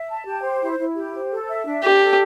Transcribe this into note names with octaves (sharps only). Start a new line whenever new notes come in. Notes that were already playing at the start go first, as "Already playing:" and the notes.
Already playing: E5
A5
G4
C5
E4
E4
G4
C5
A4
E5
D4
D4 G4
A4